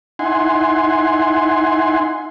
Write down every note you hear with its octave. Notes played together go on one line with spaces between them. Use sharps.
D#4 E4 F#5 G#5 C6